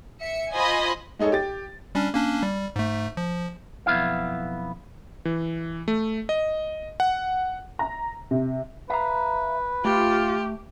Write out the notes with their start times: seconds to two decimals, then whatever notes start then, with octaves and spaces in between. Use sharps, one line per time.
0.20 E5 C#7
0.53 F4 C5 D#5 G#5 B5
1.19 G#3 D#4 G#4 A4 C#5
1.32 G4 A6
1.95 G3 C#4 D4
2.14 A#3 C#4 D4
2.43 G3
2.76 G#2 A3
3.17 F3
3.86 B1 F2 B3 E4 F5
5.25 E3
5.88 A3
6.29 D#5
7.00 F#5
7.79 A#5
8.31 C3
8.90 B4 E5 F5 A#5
9.85 A3 F4 G4